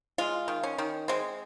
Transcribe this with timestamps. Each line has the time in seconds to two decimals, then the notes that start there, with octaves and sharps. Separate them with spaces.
0.18 G#3 F4
0.48 D#3
0.63 C#4
0.78 D#3
1.08 G#3 C4